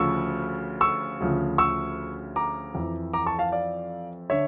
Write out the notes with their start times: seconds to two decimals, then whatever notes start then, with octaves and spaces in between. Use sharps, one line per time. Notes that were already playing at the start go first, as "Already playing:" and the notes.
Already playing: D2 C#3 F3 C#6 E6
0.81 C#6 E6
1.20 D2 C#3 F3
1.58 C#6 E6
2.36 A#5 D6
2.75 F2 E3
3.13 A#5 D6
3.26 A5 C#6
3.39 F5 A5
3.52 D5 F5
4.30 D3 C#5 E5